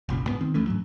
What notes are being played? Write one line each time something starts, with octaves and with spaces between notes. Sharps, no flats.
F#1 C2 A#2 C#3
G#2 B3
D#3 C4
D2 E3 A3 C#4
G#2 F#3